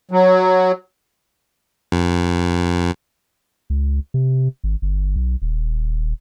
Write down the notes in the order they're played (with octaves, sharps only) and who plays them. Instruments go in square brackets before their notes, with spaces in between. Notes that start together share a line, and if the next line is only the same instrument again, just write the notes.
[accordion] F#3
[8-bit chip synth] F2
[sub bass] C#2
C3
G#1
G1
B1
D#1